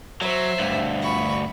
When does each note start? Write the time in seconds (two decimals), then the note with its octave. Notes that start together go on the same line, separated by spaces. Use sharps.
0.21 F#3 C5 E5
0.59 D2 G2
1.02 B5 C#6